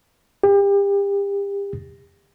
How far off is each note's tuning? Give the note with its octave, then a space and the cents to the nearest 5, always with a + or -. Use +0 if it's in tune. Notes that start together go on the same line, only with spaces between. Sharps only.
G4 +35